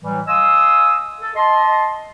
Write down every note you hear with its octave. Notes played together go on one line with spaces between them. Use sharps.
A2 E3 F#3 G3
D#5 F5 G#5 C6 D#6 E6
A4
D#5 A5 C6